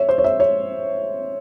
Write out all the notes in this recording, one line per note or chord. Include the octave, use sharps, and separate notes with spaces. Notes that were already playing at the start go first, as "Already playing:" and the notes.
Already playing: C#5 E5
C5
C#5
E5
C#5